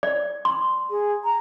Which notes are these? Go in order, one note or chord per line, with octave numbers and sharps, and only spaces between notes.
D5
C6
G#4
A#5